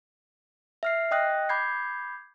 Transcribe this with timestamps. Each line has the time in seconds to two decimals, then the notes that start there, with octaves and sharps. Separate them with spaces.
0.83 E5 F6 C7
1.11 D#5 G5 D#6 F#6 A#6
1.49 B5 D6 G6 G#6 C7